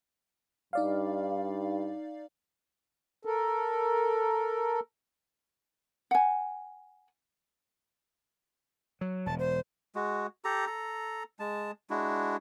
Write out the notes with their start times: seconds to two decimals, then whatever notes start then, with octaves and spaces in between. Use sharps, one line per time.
0.73 G2 D#4 D5 F5
3.25 A4 A#4
6.11 F#5 G#5
9.01 F#3
9.26 E1 A5
9.39 C5
9.95 G#3 F#4
10.45 G4 A4 A#5
10.67 A4 A#5
11.39 G#3 A5
11.90 G#3 D4 E4 F#4